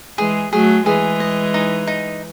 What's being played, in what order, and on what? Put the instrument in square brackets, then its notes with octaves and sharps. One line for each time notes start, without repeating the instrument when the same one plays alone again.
[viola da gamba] E3 G#3 [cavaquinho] G#4
[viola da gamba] F#3 A3 [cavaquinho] G#4
[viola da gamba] E3 G#3 [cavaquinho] G#4
[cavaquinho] D#5
D#4
D#4